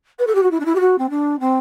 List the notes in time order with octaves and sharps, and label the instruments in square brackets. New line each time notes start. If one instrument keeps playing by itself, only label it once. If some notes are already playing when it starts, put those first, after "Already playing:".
[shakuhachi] B4
A4
G4
F#4
E4
D4
E4
G4
F#4
C4
D4
C4